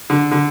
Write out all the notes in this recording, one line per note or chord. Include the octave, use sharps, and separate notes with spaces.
D3
D3